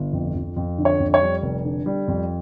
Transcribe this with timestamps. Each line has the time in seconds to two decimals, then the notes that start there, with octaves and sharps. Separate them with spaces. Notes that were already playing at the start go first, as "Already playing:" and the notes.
Already playing: G1
0.13 F2
0.35 F2
0.56 F2
0.78 D3
0.85 C#5
1.00 F2
1.14 C#5
1.21 G3
1.42 F1
1.65 D3
1.86 G3
2.08 F2